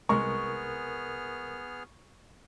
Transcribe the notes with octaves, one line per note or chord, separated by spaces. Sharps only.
C2 G#3 B3 G#4 A#4 C#6 F6